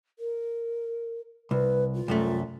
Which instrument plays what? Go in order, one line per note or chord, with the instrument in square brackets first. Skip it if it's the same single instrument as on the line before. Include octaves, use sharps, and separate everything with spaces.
[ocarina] A#4
[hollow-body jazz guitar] C2 [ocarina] B4
[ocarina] F4
[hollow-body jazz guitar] C2 F#2 A3